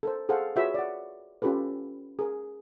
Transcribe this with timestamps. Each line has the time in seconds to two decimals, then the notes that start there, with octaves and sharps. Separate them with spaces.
0.03 A4 A#4 C5
0.29 G#4 A4 C5 F5 F#5
0.56 F4 F#4 G#4 B4 C#5 E5
0.74 D5 F#5
1.42 C#4 F4 G4 A4 B4
2.19 G#4 A#4